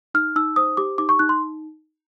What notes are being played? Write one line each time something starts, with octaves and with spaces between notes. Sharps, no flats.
D#4 F6
D#4 E6
C5 D#6
G4 D6
D#4 D6
C#6
D#4 F#6
C6